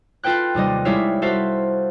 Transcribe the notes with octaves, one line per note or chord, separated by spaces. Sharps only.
F4 A4 B4 G5 F#6
D#2 C3 G3 D#5
G3 G#3 E4 C#5 E5 F5
F#4 A4 C5 E5 F5